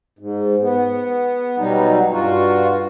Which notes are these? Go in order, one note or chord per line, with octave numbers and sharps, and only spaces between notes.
G#2
B3
B2 F#3 G3 D#4
G2 F4 F#4